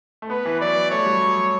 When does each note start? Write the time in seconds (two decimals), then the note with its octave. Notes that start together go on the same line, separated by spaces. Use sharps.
0.22 A3
0.29 B3 B4
0.45 E3
0.61 F#3 D5
0.91 A3 C#5
1.02 F#3
1.06 G3
1.21 F#3